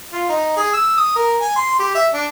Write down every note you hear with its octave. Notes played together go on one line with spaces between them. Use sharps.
F4
D#4
G#4
E6
D#6
A#4
G#5
C6
G4
E5
D4